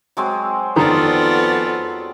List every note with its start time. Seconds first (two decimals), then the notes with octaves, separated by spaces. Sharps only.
0.17 F#3 G#3 C4
0.76 F2 D#3 B3 F4 A4 D5 A#5